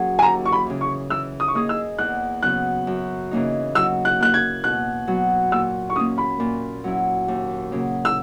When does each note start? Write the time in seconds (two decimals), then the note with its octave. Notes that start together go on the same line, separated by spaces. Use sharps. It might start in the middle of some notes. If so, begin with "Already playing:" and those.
Already playing: F#3 A#3 C#4 G#4
0.19 G#5
0.22 D#2 A#5
0.45 C#6
0.52 B5
0.66 C#3 E3
0.81 C#6
1.10 E3 E6
1.40 D#6
1.48 C#6
1.55 A#3 D#4 G#4 D#6
1.69 E6
1.98 E2 F#6
2.43 C#3 F#3 B3 F#6
2.87 F#2
3.31 C#3 E3 A#3 D#4
3.75 F#3 E6
4.05 F#6
4.19 A#3 E4 F#6
4.34 G#6
4.63 B2 F#6
5.08 F#3 B3
5.51 A#2 E6
5.90 C#6
5.96 C#4 D#6
5.99 A#3
6.18 B5
6.40 A#2
6.84 F#3 C#4 E4
7.28 D#2
7.72 C#3 F#3 A#3
8.05 E6